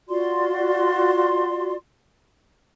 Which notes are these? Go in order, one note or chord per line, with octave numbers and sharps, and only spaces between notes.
F4 F#4 D5 C6